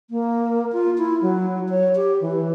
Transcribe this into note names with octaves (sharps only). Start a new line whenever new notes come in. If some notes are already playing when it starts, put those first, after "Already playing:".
A#3
F4
E4
F#3
C#5
G4
E3